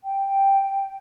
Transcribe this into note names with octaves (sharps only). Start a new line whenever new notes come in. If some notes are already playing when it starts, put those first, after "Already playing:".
G5